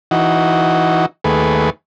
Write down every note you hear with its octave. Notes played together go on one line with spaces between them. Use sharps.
E3 D#4 F#4
D#2 A3 G#4 B4